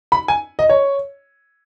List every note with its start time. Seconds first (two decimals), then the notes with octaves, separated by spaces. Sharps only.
0.12 B5
0.28 G#5
0.59 D#5
0.69 C#5